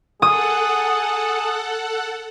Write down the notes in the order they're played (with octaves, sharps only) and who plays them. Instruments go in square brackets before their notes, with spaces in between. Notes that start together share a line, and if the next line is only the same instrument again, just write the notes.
[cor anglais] G#4 [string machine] A4 F#5 [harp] D#6